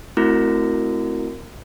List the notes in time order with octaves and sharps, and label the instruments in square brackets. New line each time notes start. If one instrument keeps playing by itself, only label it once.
[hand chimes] A3 C4 E4 F#4 A#4